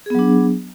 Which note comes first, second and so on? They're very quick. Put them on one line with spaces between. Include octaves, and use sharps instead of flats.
G#4 B3 F#3 D4